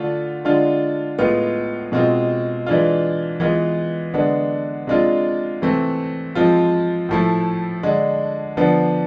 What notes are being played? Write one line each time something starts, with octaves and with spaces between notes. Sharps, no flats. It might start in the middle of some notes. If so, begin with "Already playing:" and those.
Already playing: D3 A3 D4 F4
D3 G#3 D4 F4
A2 G#3 B3 F4
B2 G#3 C4 F4
E3 G#3 D4 F4
E3 G#3 B3 F4
D3 G#3 B3 D4
C3 G#3 D4 F4
C3 E3 A3 C4
F3 G#3 C4 F4
A2 F3 A3 E4
D3 G#3 D4
D3 F3 B3 D4